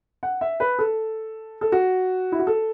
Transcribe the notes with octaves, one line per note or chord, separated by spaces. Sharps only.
F#5
E5
B4
A4
A4
F#4
E4
F#4
A4